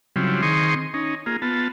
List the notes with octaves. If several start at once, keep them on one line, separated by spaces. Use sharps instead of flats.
C#3 F#3 G3 C4 E4 F4
D#3 C4 G#4 C6 C#6 D#6
C#4 D#4
A#3 F4 G#4
B3 F4 A5